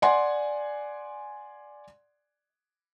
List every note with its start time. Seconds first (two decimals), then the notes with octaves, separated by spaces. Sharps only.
0.02 D5 F#5 G#5 C6